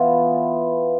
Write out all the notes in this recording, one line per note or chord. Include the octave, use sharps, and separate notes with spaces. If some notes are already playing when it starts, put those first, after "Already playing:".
Already playing: E3 B3 F4